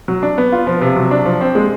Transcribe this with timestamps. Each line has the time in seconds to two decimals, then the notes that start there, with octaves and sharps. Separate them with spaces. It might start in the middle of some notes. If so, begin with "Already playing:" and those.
0.08 F#3
0.23 D4
0.38 B3
0.52 F4
0.67 F3
0.81 C3
0.96 F#3
1.11 D4
1.26 F3
1.41 C4
1.55 G#3